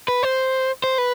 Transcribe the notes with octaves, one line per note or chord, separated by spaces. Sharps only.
B4
C5
C5
B4